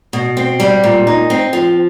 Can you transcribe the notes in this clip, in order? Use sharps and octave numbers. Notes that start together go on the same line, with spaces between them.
B2
C4
G3
A#2
D#4
C4
F3